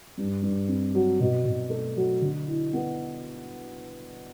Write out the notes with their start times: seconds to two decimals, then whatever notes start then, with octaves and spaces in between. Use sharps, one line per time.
0.18 G2
0.42 G2
0.68 C4
0.94 F#3
1.20 B2
1.45 B2
1.70 A3
1.96 F#3
2.22 D3
2.47 E4
2.73 B3